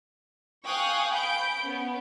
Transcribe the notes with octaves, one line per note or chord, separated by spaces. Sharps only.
F5 G5 G#5 C#6 D#6 F#6
B5 G6 D7
B3 C#4